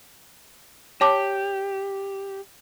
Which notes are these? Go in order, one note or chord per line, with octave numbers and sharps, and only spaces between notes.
G4 C#5 A5 D6